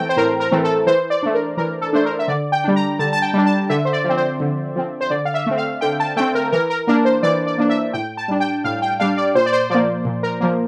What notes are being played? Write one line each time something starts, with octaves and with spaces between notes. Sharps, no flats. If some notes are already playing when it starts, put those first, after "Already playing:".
Already playing: E3 A3 C4 G5 A5 A#5
C5
A2 A#4
A#4
E3 A3 C4
A4
E3 C5
D5
A3 D4
A#4
E3 A#4
A4
A3 D4 C5
A#4
E5
D3 D5
G5
G3 D4
A#5
D3 A5
A5
G5
G3 D4
A5
D3 E5
C5
D5
F3 C4
C5
D3
F3 C4
C5
D3 D5
F5
E5
A3 C4
F5
D3 G5
A5
A3 C4 G5
A#4
E3 A#4
A#4
A#3 D4 A#4
C5
E3 D5
D5
A#3 D4
E5
A2 G5
A5
G3 D4
G5
A2 F5
G5
G3 D4 F5
D5
A#2 C5
D5
C5
F3 A#3 D5
A#2
A#4
F3 A#3 A#4